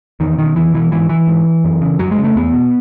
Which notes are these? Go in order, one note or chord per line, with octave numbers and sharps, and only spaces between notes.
E2 D#3
B2 D#3
E2 E3
B2 E3
G#2 E3
E3
G#2
F#2
C#3
F#2 F#3
G#3
C#3
A3
E2 B3
B2